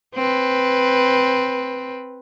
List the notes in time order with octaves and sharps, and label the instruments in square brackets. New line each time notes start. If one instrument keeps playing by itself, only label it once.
[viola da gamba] C4 B4